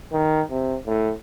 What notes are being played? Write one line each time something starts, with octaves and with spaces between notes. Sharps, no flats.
D#3
C3
A2